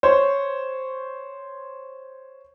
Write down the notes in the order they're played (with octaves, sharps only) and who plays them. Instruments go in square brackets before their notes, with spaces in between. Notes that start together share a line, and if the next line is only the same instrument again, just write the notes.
[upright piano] C5 C#5